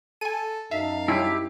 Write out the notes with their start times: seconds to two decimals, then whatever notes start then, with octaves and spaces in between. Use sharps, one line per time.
0.21 A4 G#5 D#7
0.71 F#2 D#4 E5 F5 A5
1.08 G3 C#4 E4 F4 G4